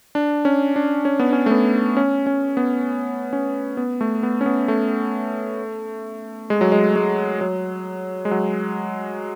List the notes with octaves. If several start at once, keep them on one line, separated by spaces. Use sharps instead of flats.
D4
C#4
D4
C#4
B3
C#4
A3
B3
C#4
C#4
B3
C#4
B3
A3
B3
C#4
B3
A3
G#3
F#3
G#3
G#3
F#3
G#3
F#3